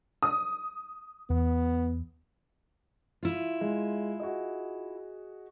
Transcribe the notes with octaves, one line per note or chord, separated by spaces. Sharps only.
D#6
E2 B3
E4 F4
G#3
F#4 G#4 D#5